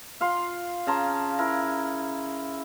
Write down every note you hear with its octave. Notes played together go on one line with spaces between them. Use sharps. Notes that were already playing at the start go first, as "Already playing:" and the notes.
F4 F5 C6
C#3 A5 A#5 C6
E4 A#4